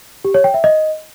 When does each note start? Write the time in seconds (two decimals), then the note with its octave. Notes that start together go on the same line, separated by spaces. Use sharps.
0.25 G4
0.34 C#5
0.44 G5
0.54 E5
0.64 D#5